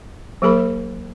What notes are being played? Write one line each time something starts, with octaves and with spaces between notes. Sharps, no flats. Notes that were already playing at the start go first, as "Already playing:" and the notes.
F#3 A#3 G#4 A#4 B5